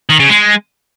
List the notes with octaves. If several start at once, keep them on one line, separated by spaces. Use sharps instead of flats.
D#3
C#3
G#3